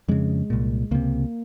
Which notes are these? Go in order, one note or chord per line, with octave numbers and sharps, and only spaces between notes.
F2 C#3 G#3
C2 A#2
C#2 C3 A#3